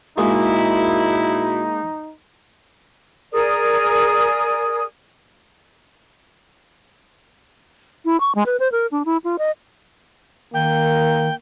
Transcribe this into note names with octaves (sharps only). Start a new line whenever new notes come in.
A#2 G#3 A#3 D#4 E4 F#4 G#4
G#4 A#4 D5 D#6
E4
C#6
G#3
B4
C5
A#4
D4
E4
F4
D#5
D#3 A#3 G5